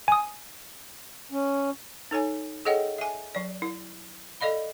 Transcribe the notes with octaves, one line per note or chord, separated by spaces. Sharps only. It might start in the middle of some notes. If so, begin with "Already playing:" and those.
G#5 D#6
C#4
D#4 A4 C#5 G#5
G#4 A4 C#5 D#5 F#5 G5
E5 G#5
F#3 D5
E4
A4 D5 D#5 F5 B5